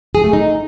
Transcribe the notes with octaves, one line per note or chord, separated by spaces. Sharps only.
G#4
A3
D#4